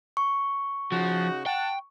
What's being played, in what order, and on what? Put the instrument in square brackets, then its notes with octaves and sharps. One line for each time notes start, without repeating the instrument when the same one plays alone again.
[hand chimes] C#6
[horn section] C#3 D#4 F#4 [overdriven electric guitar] F3
[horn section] F#5 A5 [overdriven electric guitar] G5